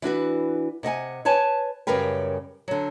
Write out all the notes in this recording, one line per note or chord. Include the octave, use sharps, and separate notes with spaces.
E3 D4 F#4 B4
C3 D#5 F#5 G#5
B4 C#5 G#5 A5
F#2 C#3 G3 A#4 B4 G5
D3 F#3